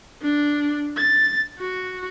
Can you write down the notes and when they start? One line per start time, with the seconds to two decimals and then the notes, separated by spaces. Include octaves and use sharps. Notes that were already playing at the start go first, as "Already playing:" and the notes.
0.22 D4
0.97 A6
1.58 F#4